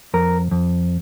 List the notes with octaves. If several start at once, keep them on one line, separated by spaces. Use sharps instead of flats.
F2 A#4
F2